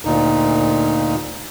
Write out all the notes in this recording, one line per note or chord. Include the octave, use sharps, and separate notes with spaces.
D2 A#2 D#4